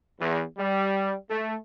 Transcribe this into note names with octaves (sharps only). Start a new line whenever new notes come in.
E2
G3
A3